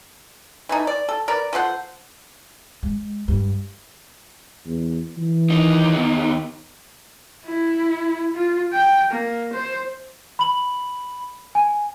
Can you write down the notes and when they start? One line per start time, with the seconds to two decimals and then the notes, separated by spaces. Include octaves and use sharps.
0.69 E3 A3 D#4
0.87 D5
1.09 A4
1.28 A#4 B4 D5
1.53 F3 A4 C5 F#5
2.83 G#3
3.28 G2
4.66 E2
5.17 E3
5.50 D#2 D#4
5.96 B3
7.45 E4
8.35 F4
8.73 G5
9.11 A#3
9.53 C5
10.39 B5 F#7
11.55 G#5